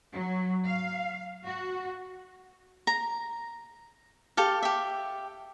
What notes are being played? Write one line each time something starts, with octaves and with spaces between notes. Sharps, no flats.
F#3
F5
F#4
A#5
G4 A4 F5
G4 E5